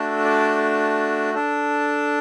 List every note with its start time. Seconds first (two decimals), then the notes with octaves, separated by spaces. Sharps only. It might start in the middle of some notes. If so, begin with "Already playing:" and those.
Already playing: A3 D4 F#4 A4
0.25 D5
1.34 D4 A4